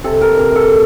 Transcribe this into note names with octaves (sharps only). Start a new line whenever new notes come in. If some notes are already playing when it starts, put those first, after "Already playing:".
C3 A4
A#4
C3 A#4
A4